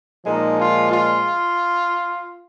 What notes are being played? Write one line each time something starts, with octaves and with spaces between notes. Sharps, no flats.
A#2 F3 G#3 D#4
F4
F4